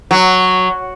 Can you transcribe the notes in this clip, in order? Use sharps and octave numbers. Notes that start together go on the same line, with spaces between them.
F#3